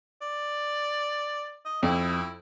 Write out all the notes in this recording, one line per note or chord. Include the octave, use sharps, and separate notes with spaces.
D5
D#5
F2 E4